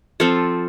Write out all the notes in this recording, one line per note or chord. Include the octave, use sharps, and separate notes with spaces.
F3 C4 F4 A4